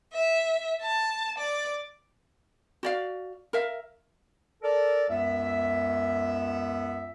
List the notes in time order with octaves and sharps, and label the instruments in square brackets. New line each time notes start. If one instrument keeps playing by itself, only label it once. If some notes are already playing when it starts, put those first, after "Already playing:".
[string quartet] E5
A5
D5
[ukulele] F#4 D5 F5
A#4 E5 F5
[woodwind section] A4 A#4 D5
C#2 F#2 B3 E5